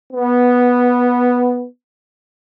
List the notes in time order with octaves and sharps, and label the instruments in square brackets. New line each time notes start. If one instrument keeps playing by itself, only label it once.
[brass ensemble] B3